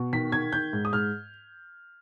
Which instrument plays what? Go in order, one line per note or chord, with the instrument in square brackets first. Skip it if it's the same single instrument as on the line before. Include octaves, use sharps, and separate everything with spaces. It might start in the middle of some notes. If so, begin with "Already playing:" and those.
Already playing: [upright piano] B2
D#3 B6
D#3 G#6
D#3 G6
G#2
D#6
G#2 F6